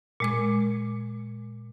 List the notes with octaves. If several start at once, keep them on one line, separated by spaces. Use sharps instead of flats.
A#2 G#3 D6